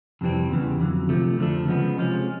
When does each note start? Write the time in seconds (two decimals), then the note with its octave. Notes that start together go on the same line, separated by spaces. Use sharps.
0.21 F2 C3 E3 G3 C4
0.50 E2 C#3 E3
0.80 F2 D3 F#3
1.09 C3 F3 A3
1.38 F2 D3 F3 A3 D4
1.68 C#3 F3 G#3 B3
1.98 C3 F3 G#3 C#4